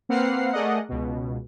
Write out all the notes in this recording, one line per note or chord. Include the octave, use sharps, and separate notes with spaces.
A#3 C4 B4 F#5 F6 C7
A3 G#4 A#4 D5 D#5 F#5
C#2 B2